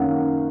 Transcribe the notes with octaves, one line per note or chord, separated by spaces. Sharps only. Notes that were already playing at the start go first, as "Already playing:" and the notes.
Already playing: F#2 D#3 A#3 C#4 F5 F#5